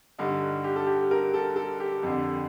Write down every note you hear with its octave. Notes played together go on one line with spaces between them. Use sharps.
G2 D3 D#4
G4
A4
G4
A#4
A4
A4
G4
F2 D3